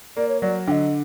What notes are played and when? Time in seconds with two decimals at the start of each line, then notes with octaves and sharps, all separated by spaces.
0.17 A#3 D5
0.29 C#5
0.41 F#3 D5
0.67 D3 D#5 G5